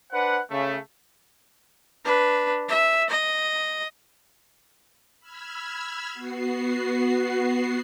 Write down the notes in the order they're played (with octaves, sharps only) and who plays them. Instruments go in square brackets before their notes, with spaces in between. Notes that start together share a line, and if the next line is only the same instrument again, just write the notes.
[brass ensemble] D4 B4 C5 F#5
C#3 A3
[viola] D4 B4
E5
D#5
[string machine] B5 E6 F6 G#6
B3 F#4 C7